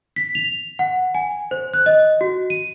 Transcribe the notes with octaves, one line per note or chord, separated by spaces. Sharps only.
B6
F7
F#5
G#5
C5
F#6
D#5
F#4
D#7